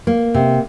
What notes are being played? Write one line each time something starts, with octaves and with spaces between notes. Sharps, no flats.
A#3
C3